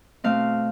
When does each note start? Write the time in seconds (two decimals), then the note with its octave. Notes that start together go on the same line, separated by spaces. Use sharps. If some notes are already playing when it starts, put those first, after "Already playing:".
0.24 B2 A3 C4 F5